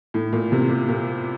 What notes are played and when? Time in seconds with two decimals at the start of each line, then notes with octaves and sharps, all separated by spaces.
0.14 A2
0.33 A#2
0.52 C3
0.70 A#2
0.88 A#2